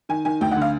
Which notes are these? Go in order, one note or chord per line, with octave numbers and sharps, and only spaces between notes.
D#3 G#5
D#3 G#5
D2 G5
F#5
D3
F5